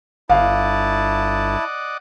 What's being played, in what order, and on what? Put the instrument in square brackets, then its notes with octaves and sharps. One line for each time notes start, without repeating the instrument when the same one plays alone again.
[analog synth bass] G1 [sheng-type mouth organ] E4 A5 [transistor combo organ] D5 D#5 F#5 [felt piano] F5